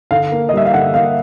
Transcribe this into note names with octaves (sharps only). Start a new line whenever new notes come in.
D3 F5
A#3
D#5
G3 E5
F5
D3 F#5
A#3 F5